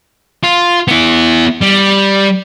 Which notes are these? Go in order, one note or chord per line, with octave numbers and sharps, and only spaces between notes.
F4
B3 E4
G3